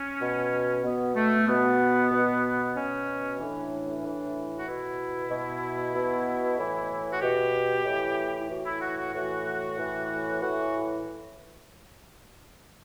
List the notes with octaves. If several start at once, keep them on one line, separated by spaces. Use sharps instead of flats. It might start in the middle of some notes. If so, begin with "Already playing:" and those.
Already playing: C#4
B2
B2 B3
A3
B2 B3
B2
B2 C#4
A2 E3 D4
A2 E3
F#4
B2 E4
B2
B2
A2 E3
F#4
B2 G4
A2 E3
E4
A2 E3 F#4
E4
F#4
F#4
A2 E3 F#4
A2 E3
A2 E3 F#4